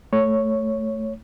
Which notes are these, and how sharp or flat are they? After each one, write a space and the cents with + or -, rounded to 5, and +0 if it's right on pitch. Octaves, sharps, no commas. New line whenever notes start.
A3 +0 C#5 +0